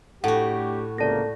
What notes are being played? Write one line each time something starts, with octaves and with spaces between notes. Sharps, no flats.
A2 A3 D4 F#4 G4 F#5
C#2 C3 A#3 A4 D5 A5 A#6